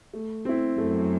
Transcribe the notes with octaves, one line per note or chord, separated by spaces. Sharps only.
A3
C4 E4
F#2 A3